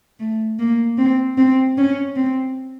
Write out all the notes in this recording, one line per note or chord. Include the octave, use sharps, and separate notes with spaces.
A3
A#3
C4
C4
C#4
C4